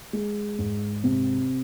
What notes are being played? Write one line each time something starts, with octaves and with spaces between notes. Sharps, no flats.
G#3
G#2
C3